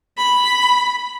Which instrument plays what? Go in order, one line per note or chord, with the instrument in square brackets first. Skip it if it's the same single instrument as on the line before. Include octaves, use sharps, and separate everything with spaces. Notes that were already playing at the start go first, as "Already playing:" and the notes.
[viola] B5